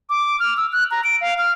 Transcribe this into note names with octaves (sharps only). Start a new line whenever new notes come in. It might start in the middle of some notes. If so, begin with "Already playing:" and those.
D6
F6
E6
F#6
A#5
D7
F5
F6